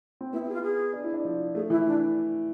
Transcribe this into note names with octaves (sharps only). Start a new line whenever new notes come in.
C4
B3 E4
E4
G#4
F4
G#4
D4
E4
D4
F3
A3 G#4
E3 E4
D4